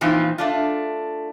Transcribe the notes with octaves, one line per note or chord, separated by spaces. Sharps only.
A#2 E3 F3 C4 D#4 F4
A3 D4 F4